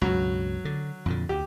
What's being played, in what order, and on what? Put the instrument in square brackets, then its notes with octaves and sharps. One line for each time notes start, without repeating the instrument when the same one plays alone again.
[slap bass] C#2 G2 B2 [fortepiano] F#3
[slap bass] D3
F2 A#2 D3
[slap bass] D2 [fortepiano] G4